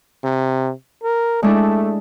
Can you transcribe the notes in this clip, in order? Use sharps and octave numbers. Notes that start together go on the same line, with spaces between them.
C3
A#4
G#3 A3 D4 E4